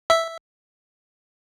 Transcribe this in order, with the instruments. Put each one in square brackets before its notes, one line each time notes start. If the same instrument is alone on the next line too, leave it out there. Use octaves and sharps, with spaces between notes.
[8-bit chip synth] E5